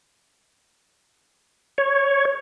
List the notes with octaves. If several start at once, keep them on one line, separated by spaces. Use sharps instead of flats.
C#5